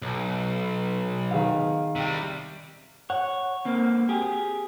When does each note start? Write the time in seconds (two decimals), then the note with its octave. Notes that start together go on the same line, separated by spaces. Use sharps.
0.02 B1
1.31 D#3 G#4 F5
1.96 C3 G3
3.10 C#5 F#5
3.65 A#3 C4
4.09 G4 G#4